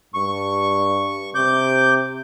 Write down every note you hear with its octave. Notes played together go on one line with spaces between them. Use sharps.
G2 C#6
C3 D6 G6